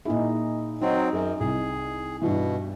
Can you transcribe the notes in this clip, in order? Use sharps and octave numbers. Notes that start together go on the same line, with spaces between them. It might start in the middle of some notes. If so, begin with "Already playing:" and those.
A#2 D#4 E4 G#4
F#3 C4 D#4
F#2 G#4
C2 G#4
G2 B2 E3